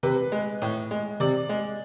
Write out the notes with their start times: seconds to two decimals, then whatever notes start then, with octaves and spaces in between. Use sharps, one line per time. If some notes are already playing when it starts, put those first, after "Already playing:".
0.03 C3 B4
0.32 G#3
0.62 A2
0.91 G#3
1.20 C3 D5
1.49 G#3